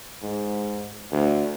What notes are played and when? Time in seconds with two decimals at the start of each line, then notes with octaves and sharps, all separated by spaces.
0.22 G#2
1.12 D2